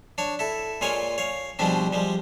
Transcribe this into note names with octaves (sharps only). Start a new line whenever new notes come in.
D4 C#5
E4 A4
A#2 G#3 F4 C#5 F5 G#5
C#5 F5
B2 F3 G3 G#3 C4 D4
F3 G3 G#3